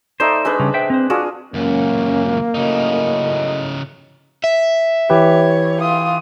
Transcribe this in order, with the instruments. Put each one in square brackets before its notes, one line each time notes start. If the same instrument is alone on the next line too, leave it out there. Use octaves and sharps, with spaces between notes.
[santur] A3 D#4 D5 [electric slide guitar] C5
[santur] G#3 D4 B4
[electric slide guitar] C#3 G3 C#4
C5 E5 G5
C4 C5
[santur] D4 F4 G#4 [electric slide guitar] F#4
[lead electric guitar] C#2 F#2 [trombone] A#3 [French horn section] C#4
[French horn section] F#2 A2 D#5 [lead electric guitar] C#3 D#4
[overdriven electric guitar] E5
[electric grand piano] E3 G4 B4 [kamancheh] C#5
[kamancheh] F4 D#6